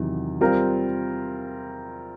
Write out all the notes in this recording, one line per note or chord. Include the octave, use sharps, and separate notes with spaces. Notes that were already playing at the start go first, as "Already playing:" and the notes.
Already playing: E2 C3 D#3 F#3
G3 C4 F4 A#4